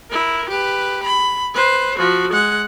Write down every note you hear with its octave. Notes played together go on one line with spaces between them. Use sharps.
E4 A#4
G4 B4
B5
B4 C5
F3 F#4
G#3 F#5